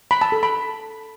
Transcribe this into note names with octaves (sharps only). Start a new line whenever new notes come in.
B5
A5
A4
B5